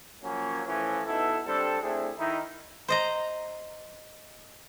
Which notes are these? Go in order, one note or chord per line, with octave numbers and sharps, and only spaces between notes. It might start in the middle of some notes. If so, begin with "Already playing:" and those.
F3 F#3 A#3 C#4
A2 E3 F3 C#4
B2 B3 D#4 E4 A4
G3 C4 D4 A4
A3 C4 D4 E4 G#4
D#3 D#4 E4
C5 D#5 A#5